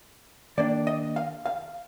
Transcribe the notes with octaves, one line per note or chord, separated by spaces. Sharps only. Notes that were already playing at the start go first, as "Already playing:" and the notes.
D#3 A#3 D4 D5
D#5
F5
F5